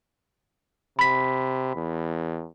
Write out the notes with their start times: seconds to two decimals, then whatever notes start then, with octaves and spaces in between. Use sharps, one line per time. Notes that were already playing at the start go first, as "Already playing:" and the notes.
0.99 C3 B5 B6
1.75 E2